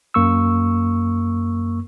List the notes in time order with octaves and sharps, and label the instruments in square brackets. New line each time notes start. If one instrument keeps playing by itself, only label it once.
[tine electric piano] F#2 A#3 C#6 E6